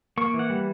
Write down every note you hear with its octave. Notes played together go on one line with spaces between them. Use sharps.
A#3 C#6
E3
F#5
G3